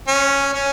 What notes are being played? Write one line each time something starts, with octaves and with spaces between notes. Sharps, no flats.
C#4
C#4